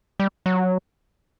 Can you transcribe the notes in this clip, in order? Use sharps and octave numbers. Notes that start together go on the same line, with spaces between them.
G3
F#3